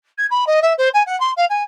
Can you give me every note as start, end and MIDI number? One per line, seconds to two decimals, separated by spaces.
0.18 0.26 92
0.30 0.45 83
0.47 0.60 75
0.62 0.73 76
0.78 0.89 72
0.94 1.03 80
1.06 1.18 78
1.20 1.31 84
1.37 1.45 77
1.50 1.63 80